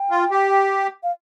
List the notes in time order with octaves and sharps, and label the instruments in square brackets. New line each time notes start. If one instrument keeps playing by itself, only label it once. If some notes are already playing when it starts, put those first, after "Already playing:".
Already playing: [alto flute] G5
[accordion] F4
G4
[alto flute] F5